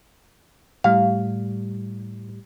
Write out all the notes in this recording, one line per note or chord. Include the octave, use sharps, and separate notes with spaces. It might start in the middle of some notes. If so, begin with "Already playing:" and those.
A2 G3 F5